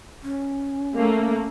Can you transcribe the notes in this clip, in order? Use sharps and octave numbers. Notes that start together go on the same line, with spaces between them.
C#4
A3 A#3